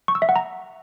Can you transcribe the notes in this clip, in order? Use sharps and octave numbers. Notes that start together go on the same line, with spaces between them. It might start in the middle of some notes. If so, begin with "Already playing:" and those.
C#6
E6
E5
F#5
A#5